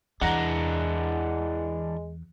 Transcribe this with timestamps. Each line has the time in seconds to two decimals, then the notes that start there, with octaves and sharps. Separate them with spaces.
0.22 E2 E3 G#3 D4 F#5 A#5 A#6